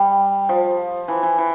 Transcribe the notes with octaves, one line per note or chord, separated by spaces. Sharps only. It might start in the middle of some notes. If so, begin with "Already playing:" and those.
Already playing: G3
F3
E3
E3
E3